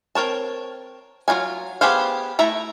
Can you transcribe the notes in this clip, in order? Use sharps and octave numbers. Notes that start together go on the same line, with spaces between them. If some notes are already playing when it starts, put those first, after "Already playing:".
C4 A#4 C#5 A5
F#3 D#4 F4 G#5
B3 G4 G#4 C5 F5
A3 E4 E5 A#5